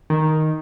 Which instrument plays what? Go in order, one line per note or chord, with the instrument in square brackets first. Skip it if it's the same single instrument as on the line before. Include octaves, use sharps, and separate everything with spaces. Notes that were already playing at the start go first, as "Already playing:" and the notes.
[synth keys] D#3